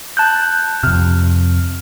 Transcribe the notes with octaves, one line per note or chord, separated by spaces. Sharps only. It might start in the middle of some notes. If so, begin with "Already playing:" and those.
A5 F#6 G6
F2 C3 F6